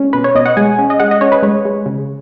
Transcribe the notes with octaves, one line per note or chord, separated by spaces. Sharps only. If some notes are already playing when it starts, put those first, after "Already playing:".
Already playing: G#3 C#4
B2 B4
C#5
B2 D#5
F#5
G#3 G#5
C#4
D#5
G#3 F#5
D#5
C#4 C#5
B4
G#3 C#5
G#3
C#3